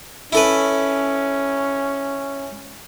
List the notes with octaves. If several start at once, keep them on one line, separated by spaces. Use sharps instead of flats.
C#4 E4 A4 B4